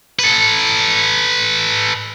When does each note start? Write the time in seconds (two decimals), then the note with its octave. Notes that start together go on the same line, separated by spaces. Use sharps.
0.19 A4 B4